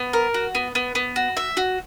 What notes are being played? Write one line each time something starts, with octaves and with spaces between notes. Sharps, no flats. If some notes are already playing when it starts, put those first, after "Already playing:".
Already playing: B3
A#4
F#4
B3
B3
B3
F#4
E5
F#4